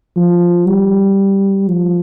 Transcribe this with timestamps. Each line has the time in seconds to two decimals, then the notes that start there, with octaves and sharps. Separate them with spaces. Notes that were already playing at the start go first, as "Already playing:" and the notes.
0.17 F3
0.67 G3
1.68 F3